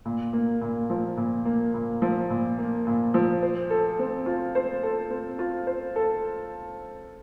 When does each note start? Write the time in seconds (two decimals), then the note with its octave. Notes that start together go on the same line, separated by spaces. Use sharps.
0.05 A#2
0.33 A#3
0.61 A#2
0.90 F3
1.17 A#2
1.45 A#3
1.74 A#2
2.02 F3
2.30 A#2
2.58 A#3
2.87 A#2
3.14 F3
3.43 C5
3.70 A4
3.99 C4
4.26 F4
4.55 C5
4.83 A4
5.10 C4
5.39 F4
5.67 C5
5.96 A4